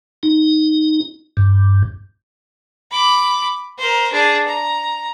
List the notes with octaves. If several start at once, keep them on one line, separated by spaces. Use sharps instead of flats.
D#4
G2
B5 D6
A#4 C5
D4 G#4
A#5